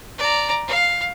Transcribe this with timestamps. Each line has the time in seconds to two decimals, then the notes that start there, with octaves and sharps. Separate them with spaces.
0.18 D5 A#5
0.67 F5